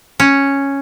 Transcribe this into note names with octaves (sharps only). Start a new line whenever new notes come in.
C#4